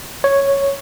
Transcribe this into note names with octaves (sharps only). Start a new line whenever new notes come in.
C#5